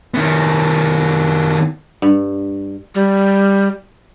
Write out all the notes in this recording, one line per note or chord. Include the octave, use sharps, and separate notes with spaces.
D#3 B3
G2
G3